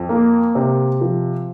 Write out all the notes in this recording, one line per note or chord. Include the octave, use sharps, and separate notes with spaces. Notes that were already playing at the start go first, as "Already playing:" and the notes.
Already playing: F2
A#3
C3
F3